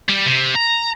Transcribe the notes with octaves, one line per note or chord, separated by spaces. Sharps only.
G3
C3
A#5